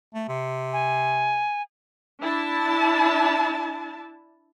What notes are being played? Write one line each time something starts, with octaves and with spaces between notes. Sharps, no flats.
A3
C3
G#5
D4 E4 A5